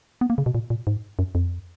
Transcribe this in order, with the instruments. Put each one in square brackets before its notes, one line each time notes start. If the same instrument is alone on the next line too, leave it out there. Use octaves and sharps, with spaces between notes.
[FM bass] B3
A#3
C#3
B2
A#2
A#2
G#2
F#2
F2